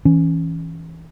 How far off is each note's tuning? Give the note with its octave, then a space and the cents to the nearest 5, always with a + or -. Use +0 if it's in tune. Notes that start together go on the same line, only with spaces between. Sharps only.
E3 -15 C#4 +0